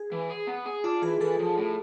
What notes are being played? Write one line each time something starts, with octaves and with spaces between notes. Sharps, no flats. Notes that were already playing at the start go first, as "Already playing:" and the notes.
Already playing: G#4
E3
G#4
B3
G#4
D4 F4
E3 G#4
E3 A4
F3
A2